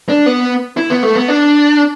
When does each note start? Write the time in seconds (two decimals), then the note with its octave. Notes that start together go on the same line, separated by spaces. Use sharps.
0.09 D4
0.26 B3
0.77 E4
0.90 B3
1.03 A3
1.15 B3
1.28 D4